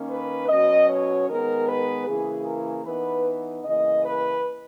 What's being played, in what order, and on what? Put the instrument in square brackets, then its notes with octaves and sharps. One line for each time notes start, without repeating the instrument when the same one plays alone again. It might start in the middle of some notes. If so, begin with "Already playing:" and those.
Already playing: [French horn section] D#3 A#3 C#4
B4
B2 F#3 C#4 D#5
C#5
D#3 G#3 B3 A#4
B4
C#3 E3 A#3 G#4
A#4
E3 B3 D#4 B4
C#3 E3 A#3 D#5
B4